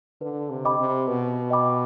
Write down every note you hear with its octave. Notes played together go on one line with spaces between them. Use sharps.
D3 B4
C3
D#5 G5 B5 D6
C3
B2 B4
D#5 G5 B5 D6